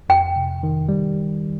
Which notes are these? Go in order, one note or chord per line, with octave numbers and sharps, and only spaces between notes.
F2 G5
C3
D#3
G3